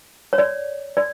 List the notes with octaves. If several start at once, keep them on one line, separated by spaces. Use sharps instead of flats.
C#5
D5
D5